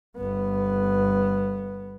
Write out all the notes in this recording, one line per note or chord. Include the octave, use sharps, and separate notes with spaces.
G1 B3